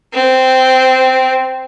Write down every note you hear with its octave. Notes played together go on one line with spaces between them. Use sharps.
C4